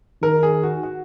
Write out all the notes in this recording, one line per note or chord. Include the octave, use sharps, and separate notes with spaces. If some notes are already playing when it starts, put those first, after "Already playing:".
D#3 A#4
G#4
F#4
F#4